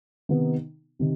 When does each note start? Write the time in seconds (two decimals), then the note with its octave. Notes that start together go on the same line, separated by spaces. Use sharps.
0.29 C3 D#3 B3 D#4
0.99 C3 D#3